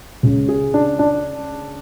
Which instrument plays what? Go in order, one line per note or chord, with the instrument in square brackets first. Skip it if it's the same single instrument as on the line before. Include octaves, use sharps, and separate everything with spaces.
[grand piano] C#2 C#3 G#3 C#4
G#4
D4
D4